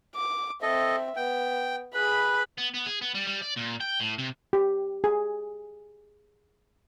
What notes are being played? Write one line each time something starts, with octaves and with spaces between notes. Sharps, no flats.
D6
C4 A4 D#5 E5
B3 G5
G#4 B4 B5
B3
B3
G#4
B3
G3
G3
D5
A#2
G5
A2
C3
G4
G#4